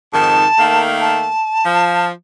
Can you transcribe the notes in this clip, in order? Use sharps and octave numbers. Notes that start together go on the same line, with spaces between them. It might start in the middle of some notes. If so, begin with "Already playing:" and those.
F2 G#2 D#3 A5
D#3 A3 A#3
A5
F3